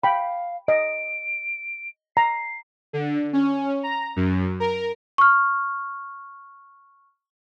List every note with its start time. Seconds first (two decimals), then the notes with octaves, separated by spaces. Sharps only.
0.03 F5 G5 B5
0.68 D#5 D7
2.17 A#5 C7
2.93 D3
3.33 C#4
3.83 A#5
4.16 F#2
4.60 A#4
5.18 C#6 F6